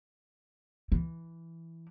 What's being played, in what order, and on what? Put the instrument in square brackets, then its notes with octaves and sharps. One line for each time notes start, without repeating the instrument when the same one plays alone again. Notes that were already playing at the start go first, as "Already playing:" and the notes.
[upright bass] E3